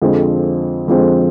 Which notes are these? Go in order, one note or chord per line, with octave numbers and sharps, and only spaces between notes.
F2 D3 F3 G#3 C4
F2 D3 F3 G#3 C4